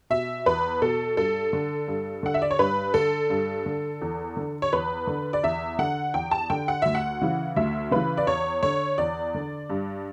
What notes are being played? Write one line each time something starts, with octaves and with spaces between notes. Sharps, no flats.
B2 E5
E2 B4
B2 A4
G2 A4
D3
G2
D3 F#5
E5
D5
C#5
G2 B4
D3 A4
G2
D3
E2
D3
C#5
E2 B4
D3
D5
E2 E5
D3 F#5
E2 G5
A5
D3 G5
F#5
D2 E5
F#5
C#3 E3
D2 E5
C#3 E3 B4
D5
E2 C#5
D3 C#5
E2 D5
D3
G2